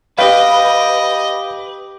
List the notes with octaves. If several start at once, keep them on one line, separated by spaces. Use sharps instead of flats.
G4 B4 D#5 F5 G5